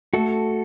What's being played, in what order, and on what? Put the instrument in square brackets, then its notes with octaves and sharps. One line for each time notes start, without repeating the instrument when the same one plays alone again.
[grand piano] A3 [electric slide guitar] F#4 A4